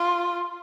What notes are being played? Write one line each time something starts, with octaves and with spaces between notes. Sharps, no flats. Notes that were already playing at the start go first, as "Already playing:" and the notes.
Already playing: F4